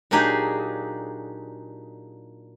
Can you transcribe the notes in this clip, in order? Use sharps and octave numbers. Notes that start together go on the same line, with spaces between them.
A#2 F#3 D4 D#4 G4 G#4